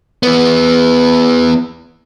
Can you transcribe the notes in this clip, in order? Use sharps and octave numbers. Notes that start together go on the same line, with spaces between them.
E3 B3